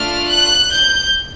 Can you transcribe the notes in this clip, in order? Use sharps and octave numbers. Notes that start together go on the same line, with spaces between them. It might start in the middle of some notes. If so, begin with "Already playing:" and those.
Already playing: A3 D4 F4 F6
F#6
G6